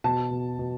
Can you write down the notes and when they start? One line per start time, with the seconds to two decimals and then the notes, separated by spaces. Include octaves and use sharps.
0.04 B2 A5
0.31 B2
0.59 B2